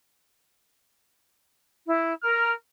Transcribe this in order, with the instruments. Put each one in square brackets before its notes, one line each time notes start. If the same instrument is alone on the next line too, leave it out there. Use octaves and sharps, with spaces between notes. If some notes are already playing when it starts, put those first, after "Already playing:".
[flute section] E4
[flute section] A#4 [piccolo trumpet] F6